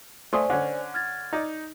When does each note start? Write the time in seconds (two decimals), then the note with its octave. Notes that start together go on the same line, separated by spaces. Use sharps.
0.33 A3 C5 D5 G#5 C6 D#6
0.50 D3 C#4
0.94 F6 G#6 A6
1.33 D#4 D5